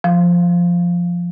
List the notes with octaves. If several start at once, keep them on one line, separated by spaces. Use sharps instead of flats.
F3